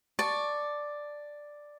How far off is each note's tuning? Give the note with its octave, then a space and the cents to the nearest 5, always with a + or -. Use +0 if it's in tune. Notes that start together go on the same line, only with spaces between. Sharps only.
D5 +5 A5 +0 C#6 +0